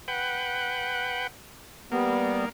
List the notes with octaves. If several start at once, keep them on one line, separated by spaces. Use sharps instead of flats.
B4 F#5 G5
G3 A#3 B3